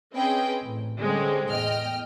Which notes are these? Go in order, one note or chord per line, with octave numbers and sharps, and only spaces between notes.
C4 C#4 G#4 B4 D#5 G5
A1
D3 G3 G#3 C4 C#4
E2 A2 D#5 G5 F6